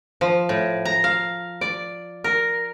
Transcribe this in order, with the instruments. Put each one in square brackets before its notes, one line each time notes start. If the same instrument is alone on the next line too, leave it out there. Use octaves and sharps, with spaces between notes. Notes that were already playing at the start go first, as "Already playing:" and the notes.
[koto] F3
A2
A#5
F5
D5
A#4